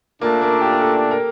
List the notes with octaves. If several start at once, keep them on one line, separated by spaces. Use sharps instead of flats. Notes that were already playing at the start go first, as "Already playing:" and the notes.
A#2 A3 A#3 D4
A#3
G4
A#4
A4
A#4